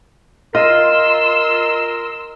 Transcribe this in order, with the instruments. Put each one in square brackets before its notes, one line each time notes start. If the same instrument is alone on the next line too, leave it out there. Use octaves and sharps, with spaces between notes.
[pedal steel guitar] F4 [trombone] A#4 [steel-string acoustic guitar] D#5 [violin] C6 E6